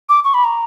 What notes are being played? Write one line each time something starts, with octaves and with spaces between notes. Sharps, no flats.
D6
C#6
B5
A#5